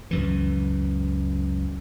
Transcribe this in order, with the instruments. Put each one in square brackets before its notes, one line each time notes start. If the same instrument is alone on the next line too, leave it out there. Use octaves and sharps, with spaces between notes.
[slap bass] C#2 F#2 E3